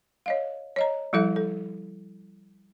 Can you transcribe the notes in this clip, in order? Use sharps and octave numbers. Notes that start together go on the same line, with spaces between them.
C#5 D#5 F5
C#5 D#5 A#5
F3 G3 E4 A4 E5
A4